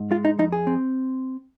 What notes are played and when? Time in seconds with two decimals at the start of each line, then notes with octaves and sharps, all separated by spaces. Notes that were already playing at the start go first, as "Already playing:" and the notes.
Already playing: G#2
0.11 G#3 F4
0.25 D#4
0.39 F2 D#4
0.52 G#4
0.67 C4